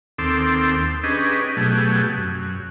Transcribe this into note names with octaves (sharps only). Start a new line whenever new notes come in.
D#2 C4 A4 C6 D6 E6
C#4 D4 G4 G#4 B4 D#5
B2 F#3 A3 G4 G#4
F#2